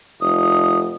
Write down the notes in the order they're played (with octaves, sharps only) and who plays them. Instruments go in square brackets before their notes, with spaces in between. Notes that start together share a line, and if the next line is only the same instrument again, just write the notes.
[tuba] F1 [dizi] D#6